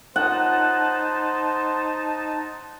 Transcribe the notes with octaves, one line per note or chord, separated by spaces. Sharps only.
D#4 C5 F#5 A5